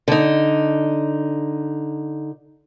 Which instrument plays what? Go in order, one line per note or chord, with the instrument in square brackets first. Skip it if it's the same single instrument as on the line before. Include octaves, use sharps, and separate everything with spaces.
[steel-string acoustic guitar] D3 D#4